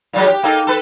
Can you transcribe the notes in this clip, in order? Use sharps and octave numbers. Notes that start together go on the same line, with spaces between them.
A#2 F#3 G#3
G4
A#3 D#4 A4
A4 B4